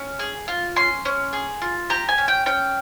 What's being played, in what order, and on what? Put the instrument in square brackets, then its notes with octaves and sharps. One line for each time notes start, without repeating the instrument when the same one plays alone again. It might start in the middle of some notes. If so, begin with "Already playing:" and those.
Already playing: [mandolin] C#4
G#4
F4
C#4 C6
C#4
G#4
F4
G4 A#5
G#5
C#4
G5
C#4 G5